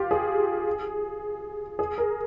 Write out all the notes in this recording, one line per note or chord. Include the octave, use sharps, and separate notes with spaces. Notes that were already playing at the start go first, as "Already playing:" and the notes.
Already playing: F4 G4
G#4
G#4
A#4